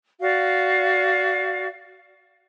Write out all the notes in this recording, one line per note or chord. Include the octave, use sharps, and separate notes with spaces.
F#4 D5 F5